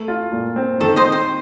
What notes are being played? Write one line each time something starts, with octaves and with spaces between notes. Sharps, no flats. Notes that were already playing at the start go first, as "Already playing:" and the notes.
Already playing: A3
F4
A#2
C4
D#3 A4
C5 D#5
C4
C5